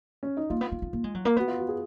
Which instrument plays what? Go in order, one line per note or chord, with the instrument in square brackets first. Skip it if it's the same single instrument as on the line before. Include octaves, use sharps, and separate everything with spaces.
[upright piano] C#4
D#4
[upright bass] A#3 [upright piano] F4
[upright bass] B3
A#3
B3
A#3
G#3
F#3
A#3
[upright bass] B3 [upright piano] F#4
[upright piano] F4
F#4
G#4